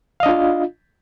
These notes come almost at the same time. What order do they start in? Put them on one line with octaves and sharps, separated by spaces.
F5 D#5 D4 F4